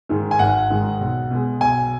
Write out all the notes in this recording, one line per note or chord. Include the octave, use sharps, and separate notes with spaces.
G#2 D#3 G#3
G#5
G#1 F#5
G#2 D#3 G#3
B1
B2 G#3
B1 G#5